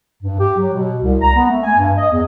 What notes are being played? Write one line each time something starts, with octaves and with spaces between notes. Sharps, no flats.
G2
G4
F#3
B2
C2
A#5
B3
A3
G#5
G2
D#5
E2